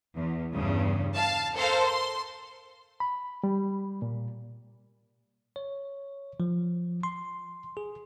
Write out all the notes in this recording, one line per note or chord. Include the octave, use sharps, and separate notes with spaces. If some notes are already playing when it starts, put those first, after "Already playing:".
E2
E2 G2 C#3
F5 A5
A4 A#4 C5 F5
C6
B5
G3
A#2
C#5
F3
C6
G#4